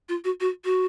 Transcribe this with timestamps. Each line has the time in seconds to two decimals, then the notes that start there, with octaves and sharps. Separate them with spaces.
0.09 F4
0.24 F#4
0.40 F#4
0.65 F#4